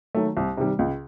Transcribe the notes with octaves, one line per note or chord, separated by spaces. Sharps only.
D#3 F#3 A3
C2
C3 D#3 G3
C#2